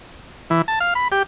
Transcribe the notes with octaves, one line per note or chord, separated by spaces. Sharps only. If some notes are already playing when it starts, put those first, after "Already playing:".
E3
A5
F5
B5
G4